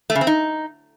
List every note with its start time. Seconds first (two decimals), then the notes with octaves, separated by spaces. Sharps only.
0.10 A3
0.15 C#3
0.21 C4
0.27 D#4